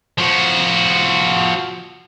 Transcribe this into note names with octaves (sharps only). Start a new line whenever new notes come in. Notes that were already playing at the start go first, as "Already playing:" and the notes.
F3 F#4